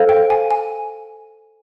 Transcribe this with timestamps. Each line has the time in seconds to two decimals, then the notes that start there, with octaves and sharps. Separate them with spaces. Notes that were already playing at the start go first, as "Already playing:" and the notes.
Already playing: A4 C5 F5
0.09 G5
0.30 G#5
0.51 G#5